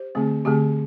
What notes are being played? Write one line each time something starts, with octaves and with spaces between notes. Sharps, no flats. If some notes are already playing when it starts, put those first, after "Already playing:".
Already playing: G4 C5
D3 A3 C4
D3 A3 C4 G4